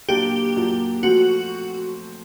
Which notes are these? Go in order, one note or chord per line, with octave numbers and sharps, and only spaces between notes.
A#2 F#3 A#3 D4 F4 G4
A#2 F#3 A#3 D4 F4
F3 A3 C4 F#4